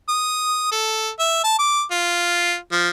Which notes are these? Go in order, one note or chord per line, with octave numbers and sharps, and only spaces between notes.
D#6
A4
E5
A5
D6
F4
F3